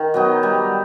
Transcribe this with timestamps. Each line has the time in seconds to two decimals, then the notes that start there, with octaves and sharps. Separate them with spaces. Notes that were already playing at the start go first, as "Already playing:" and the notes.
Already playing: D#3
0.14 F#3 B3 D#4
0.43 G3